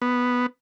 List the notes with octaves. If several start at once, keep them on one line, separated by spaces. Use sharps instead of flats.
B3